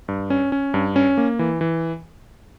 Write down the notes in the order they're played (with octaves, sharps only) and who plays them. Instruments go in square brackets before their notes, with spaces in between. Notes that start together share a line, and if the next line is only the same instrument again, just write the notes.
[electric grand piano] G2
C#4
C#4
G2
C#4
A#3
E3
E3